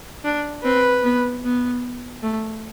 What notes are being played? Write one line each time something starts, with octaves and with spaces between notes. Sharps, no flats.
D4
C4 B4
B3
B3
A3